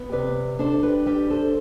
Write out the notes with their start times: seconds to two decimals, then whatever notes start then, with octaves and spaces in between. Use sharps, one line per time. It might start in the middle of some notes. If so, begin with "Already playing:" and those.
Already playing: B3
0.12 C3 B4 D5
0.59 D4 A4 C5
0.83 G4 B4
1.06 G3 G4 B4
1.30 A4 C5